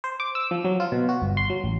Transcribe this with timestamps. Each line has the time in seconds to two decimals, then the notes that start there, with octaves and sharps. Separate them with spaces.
0.04 C5
0.20 D6
0.35 E6
0.51 F3
0.65 F#3
0.80 F4
0.92 B2
1.09 F#4
1.22 G1
1.37 C6
1.50 F#3
1.64 A1